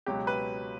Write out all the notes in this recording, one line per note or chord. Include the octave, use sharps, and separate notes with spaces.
C#2 B2 F#3 G4
B4